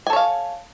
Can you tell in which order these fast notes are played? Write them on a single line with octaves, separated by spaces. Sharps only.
G#5 A4 C#5 F5